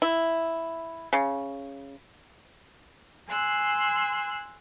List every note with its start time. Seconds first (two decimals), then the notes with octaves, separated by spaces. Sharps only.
0.02 E4
1.13 C#3
3.30 G#5 C6 E6 F#6